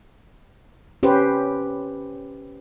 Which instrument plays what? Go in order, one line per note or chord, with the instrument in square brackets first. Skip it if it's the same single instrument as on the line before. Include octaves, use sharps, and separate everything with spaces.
[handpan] C#4 G4 B4 C5